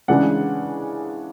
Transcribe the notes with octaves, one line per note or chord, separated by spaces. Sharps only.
C#3 E3 G#3 D4 F#5